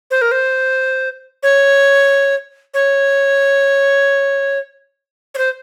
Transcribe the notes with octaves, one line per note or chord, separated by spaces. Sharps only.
C5
A#4
C5
C#5
C#5
C#5
C5